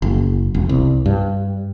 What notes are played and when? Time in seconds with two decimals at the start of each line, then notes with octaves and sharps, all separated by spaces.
0.02 F#1
0.54 E1
0.69 C2
1.06 G2